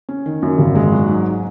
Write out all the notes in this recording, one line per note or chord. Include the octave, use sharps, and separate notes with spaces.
C#4
D#3
F#2
G#1
G#3
F#3
G#2